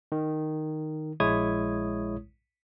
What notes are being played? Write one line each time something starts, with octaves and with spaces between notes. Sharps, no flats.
D#3
A#1 G#3 E4 C#5 D#6 G#6